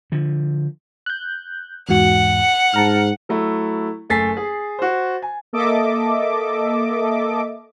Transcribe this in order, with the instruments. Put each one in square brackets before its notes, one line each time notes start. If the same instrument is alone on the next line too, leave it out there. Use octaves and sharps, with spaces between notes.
[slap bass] D3 F3
[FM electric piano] F#6 G6
[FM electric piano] E2 G#2 F#4 [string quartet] F#5
[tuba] G#2 [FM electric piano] A5 A#5 F6
[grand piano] F#3 A3 E4
F#1 A3 G#5 A6 B6 C7
G#4
F#4 C5
G#5
[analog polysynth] A#3 A4 D#5 E5 D6